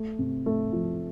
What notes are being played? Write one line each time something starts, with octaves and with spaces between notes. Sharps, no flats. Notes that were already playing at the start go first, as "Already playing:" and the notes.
Already playing: A3
C3
A3
F3